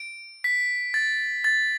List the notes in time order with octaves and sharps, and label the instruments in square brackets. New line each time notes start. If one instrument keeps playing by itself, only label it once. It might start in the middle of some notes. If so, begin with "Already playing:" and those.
Already playing: [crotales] D7
B6
A6
A6